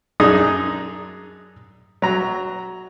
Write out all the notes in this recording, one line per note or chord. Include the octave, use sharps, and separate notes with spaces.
F#2 D4 D#4 G#4 D#5 D#6
F#3 A#5